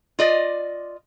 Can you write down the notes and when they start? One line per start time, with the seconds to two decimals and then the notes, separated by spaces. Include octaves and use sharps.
0.19 F4 D5 D#5